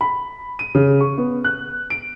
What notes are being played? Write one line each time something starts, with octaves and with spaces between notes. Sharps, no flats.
B5
D#7
C#3
C#6
B3
F#6
D7